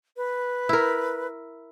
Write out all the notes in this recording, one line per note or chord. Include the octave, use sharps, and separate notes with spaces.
B4
E4 A#4